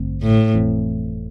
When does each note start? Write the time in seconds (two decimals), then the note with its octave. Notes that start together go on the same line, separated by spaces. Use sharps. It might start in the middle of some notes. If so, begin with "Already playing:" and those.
Already playing: A1 G2 D3 A3 C4
0.23 A2
0.53 G1 F2 E3 A3 C4